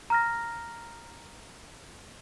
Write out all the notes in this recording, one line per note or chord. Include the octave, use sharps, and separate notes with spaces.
A#5 F6 A#6